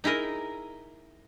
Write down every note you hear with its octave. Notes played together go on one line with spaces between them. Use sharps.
D#4 E4 G#4 A#4 D#5